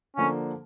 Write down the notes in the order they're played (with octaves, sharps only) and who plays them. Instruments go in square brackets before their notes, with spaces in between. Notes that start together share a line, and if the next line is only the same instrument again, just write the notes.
[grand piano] D3 F3 A#3 D4 [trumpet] C#4